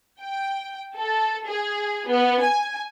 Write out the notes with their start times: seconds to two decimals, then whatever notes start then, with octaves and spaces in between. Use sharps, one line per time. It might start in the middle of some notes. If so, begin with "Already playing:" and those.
0.22 G5
0.96 A4
1.48 G#4
2.09 B3
2.43 G#5